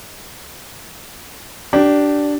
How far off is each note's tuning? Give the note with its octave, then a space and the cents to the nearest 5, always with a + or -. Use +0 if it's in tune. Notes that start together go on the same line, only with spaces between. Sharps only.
D4 -5 G4 -25